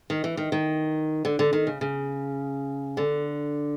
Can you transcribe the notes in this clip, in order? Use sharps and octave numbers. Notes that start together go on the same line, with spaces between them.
D#3
E3
D#3
D#3
D3
D3
D#3
C#3
C#3
D3